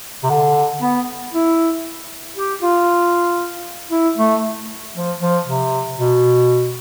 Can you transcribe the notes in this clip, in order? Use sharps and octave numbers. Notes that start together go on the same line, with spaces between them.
C3
D3
B3
E4
G4
F4
E4
A3
F3
F3
C3
B2